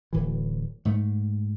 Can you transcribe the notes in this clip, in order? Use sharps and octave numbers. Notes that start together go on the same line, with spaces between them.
D1 E3
G#2 A3